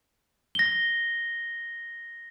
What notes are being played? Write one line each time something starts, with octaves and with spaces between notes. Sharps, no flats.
A#6 G7